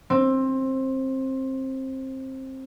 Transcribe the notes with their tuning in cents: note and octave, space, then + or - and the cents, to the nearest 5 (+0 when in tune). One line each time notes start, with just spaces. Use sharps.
C4 +20